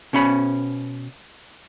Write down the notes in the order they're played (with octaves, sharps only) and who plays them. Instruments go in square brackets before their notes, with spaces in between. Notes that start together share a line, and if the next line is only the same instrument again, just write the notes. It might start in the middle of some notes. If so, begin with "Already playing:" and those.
[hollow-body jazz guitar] B2 C#4 B5